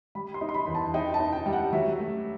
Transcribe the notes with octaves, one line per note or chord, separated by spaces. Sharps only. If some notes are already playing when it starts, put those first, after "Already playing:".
G3 B5
C6
D#4
C6
B5
E2
A5
D#4 G5
A5
D#4
G5
G3
F#5
F#3 E5
A3